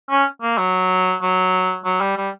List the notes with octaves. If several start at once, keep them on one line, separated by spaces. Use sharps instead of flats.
C#4
A#3
F#3
F#3
F#3
G3
G3